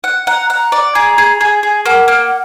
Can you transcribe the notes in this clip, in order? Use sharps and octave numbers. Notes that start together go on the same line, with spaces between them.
F#5
F#5 A#5
F#5 A#5
D5
G#4 A#5
G#4
G#4 G#5
G#4
A#3 F#5
A#3